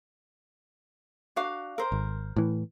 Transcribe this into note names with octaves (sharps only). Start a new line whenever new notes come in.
D4 F#4 F5
A#4 C5
G#1
A2 E3